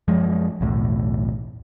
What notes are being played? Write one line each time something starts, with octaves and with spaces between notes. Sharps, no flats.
F#2 F3 G#3
B1 E2 A2